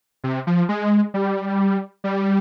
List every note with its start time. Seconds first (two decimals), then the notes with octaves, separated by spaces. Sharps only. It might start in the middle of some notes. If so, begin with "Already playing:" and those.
0.24 C3
0.47 F3
0.69 G#3
1.14 G3
2.04 G3